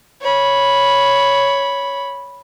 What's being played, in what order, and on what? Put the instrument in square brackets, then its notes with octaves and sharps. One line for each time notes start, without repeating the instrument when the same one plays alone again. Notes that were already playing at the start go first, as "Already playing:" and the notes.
[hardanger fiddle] C#5 B5